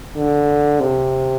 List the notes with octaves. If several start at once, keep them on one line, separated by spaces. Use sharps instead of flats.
D3
C3